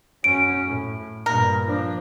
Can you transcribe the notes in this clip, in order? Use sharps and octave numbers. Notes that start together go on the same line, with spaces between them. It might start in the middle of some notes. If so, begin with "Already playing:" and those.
F#2 C#4 D7
A2
G2 A#2 A#4
F3 D4